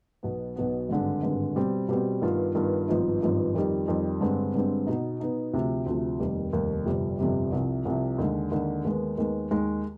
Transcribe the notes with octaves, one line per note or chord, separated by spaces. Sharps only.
B1 B2 B3
B1 B2 B3
G#1 G2 D3 G#3
G#1 G2 D3 G#3
B2 G3 C4
B2 G3 C4
G2 D#3 B3 F4
G2 D#3 B3 F4
G#1 G2 F3 B3 D#4
G#1 G2 F3 B3 D#4
F2 D#3 G3
F2 D#3 G3
G2 D3 G#3 C4
G2 D3 G#3 C4
B2 B3 D#4
B2 B3 D#4
D2 C3 F3
D2 C3 F3
F1 D#2 D#3 G3
F1 D#2 D#3 G3
G1 F2 C3 G3
G1 F2 C3 G3
C2 C3 F3
C2 C3 F3
D#2 D3 G#3
D#2 D3 G#3
D#2 D#3 G#3 B3
D#2 D#3 G#3 B3
D#2 D#3 G#3